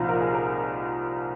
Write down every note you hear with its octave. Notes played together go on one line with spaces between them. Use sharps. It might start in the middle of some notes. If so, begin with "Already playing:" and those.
Already playing: C2 A#2 F3 D#4 F4
A#4
G#4
A#4